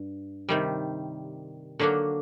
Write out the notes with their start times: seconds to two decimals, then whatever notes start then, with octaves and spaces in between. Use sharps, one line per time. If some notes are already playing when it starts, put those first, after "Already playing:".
Already playing: G2
0.49 C3 D#3 G3
1.79 D3 F#3 A#3 D4 F#4